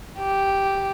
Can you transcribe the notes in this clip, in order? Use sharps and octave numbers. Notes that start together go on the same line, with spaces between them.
G4